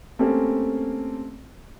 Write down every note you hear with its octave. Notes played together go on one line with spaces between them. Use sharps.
A3 A#3 C4 C#4 G4 A4